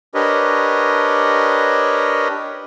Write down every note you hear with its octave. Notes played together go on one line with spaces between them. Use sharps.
D4 G4 A#4 B4 C#5 D#5